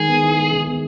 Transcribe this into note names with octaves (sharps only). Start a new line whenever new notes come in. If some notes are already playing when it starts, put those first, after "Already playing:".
Already playing: D#3 G#3 G#4
B3
E4
G#3
D#3
B3